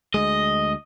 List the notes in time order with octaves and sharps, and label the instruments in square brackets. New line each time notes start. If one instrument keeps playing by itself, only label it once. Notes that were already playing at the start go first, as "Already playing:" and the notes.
[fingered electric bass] D2 G#3 [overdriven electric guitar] D#5